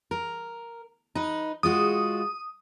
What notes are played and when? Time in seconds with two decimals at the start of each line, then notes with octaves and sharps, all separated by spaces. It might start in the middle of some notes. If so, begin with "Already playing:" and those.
0.11 A#4
1.15 D#4 B4
1.63 G#3 F4 F#4 D#6